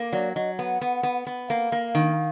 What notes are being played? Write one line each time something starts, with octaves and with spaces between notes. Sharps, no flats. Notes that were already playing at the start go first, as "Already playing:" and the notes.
Already playing: A#3
F#3 D5
F#3 D#5
B3 F#5
B3
B3
B3
A#3 F5
A#3
D#3